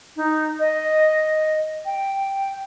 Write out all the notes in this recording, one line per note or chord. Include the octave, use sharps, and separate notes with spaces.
D#4
D#5
G5